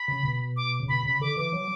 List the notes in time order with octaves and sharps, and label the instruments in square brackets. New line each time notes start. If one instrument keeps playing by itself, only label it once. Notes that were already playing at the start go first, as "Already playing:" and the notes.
Already playing: [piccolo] B5
[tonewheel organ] C#3
B2
[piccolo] D6
[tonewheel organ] C#3
[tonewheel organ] B2 [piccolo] B5
[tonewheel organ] C#3 [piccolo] B5
[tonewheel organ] D3 [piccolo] D6
[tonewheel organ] E3 [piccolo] D6
[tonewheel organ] F#3